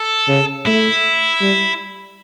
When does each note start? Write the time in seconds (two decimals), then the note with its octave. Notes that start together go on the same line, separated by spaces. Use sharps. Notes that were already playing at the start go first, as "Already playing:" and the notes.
Already playing: A4
0.28 C#3
0.66 A3 E4
1.41 G3